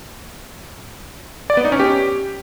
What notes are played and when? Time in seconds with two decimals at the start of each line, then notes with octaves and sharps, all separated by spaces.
1.50 D5
1.57 B3
1.65 D#4
1.72 C#4
1.80 G4